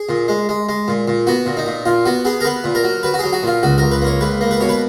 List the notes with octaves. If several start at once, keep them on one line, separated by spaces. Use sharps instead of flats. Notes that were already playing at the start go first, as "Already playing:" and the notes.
Already playing: G#4
A#2
G#3
G#3
G#3
A#2
A#2
B3 F#4
A#2
D#4
A#2
A#2 F4
B3 F#4
B3 G#4
A#4
B3 B4
A#2
A#4
F#3
F#3 B4
F#4
F#3 G#4
F#4
A#2 F4
C#2 F#4
C#2 A#4
B4
A#3 C#5
C#2 B4
A#3
B4
B2 C#5
B4